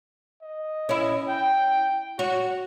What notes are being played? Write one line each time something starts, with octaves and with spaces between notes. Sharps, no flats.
D#5
C#4 E4
G5
F#4 C#5